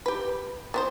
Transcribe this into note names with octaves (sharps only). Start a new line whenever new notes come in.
G4 B4
B3 C4 C5